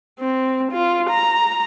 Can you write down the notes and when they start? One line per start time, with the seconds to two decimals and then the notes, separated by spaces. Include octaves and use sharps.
0.20 C4
0.72 F4
1.10 A#5